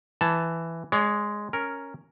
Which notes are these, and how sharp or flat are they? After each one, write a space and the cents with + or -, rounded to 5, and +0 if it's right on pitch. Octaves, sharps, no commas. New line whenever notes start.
E3 +5 A5 +0
G#3 +0 C#5 +40
C#4 +0 A#4 +0